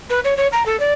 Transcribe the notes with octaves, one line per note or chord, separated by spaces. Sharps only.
B4
C#5
C#5
A#5
A4
D5